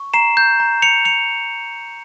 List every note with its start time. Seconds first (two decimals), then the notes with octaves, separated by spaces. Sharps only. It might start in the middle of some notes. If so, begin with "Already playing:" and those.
Already playing: C#6
0.14 A#5 C7 E7
0.37 G6
0.60 A#5
0.82 C#7 F7
1.05 G6 C#7 F7